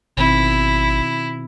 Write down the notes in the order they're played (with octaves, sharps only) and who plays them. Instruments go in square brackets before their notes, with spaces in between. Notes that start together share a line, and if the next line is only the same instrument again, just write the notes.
[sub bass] G#1 [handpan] B2 D#3 C4 [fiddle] E4